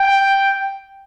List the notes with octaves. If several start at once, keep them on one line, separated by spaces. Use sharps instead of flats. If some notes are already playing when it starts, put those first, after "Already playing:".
Already playing: G5